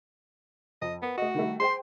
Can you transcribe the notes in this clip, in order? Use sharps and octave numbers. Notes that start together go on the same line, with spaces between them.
F2 D#5
B3 A#4
A3 F#4 D#5
D#3 G3 A3
G#4 C5 G5 C6